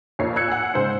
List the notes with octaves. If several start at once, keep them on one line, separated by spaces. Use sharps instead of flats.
F2 A#2 C#5 C7
E6 F#6 G#6 C#7
F#5 G#5
G#2 C#3 C5